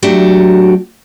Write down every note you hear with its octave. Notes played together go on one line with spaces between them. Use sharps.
F#3 A3 D4 F#4 G4